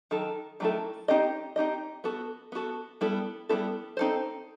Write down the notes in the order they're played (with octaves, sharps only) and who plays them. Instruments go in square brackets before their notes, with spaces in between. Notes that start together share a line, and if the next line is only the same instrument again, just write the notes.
[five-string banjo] D#3 F#3 A4
D#3 F#3 A3 E4 A4
C4 D#4 G4 D#5
C4 D#4 G4 D#5
B3 F#4 A4
B3 F#4 A4
G3 B3 E4 A4
G3 B3 E4 A4
C4 D#4 A4 C5